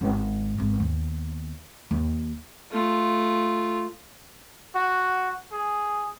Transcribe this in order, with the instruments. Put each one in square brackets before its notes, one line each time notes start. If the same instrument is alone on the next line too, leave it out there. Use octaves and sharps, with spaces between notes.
[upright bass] G#1
G#1 E2
D#2 B3
D#2 D#4
[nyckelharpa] A3 F4
[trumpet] F#4
G#4